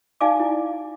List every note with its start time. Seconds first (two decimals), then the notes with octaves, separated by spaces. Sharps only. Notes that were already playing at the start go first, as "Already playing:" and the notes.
0.21 D#4 D5 F5 G#5 D6
0.40 E4